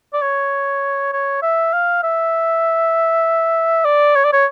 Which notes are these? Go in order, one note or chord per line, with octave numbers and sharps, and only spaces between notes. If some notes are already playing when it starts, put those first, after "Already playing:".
D5
C#5
C#5
E5
F5
E5
D5
C#5
D5
C#5